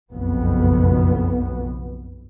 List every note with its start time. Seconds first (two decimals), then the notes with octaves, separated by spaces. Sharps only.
0.12 F#1 B1 F2 B3